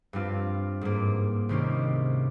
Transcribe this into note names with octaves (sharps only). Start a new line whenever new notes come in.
G2 G3 C4 F4
G#2 G3 A#3
C2 C3 D#3 A#3 C#4